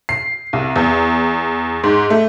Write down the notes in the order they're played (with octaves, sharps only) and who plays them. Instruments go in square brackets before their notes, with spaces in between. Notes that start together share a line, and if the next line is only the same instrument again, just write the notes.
[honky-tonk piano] C7
C2
E2
G#2
A3